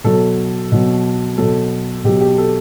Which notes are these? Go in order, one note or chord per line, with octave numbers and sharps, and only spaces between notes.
B2 F#3 A4
B2 F#3
B2 F#3 A4
B2 F#3 G4
G4
A4